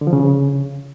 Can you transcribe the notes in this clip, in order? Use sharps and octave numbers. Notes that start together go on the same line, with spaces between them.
D3
F3
C#3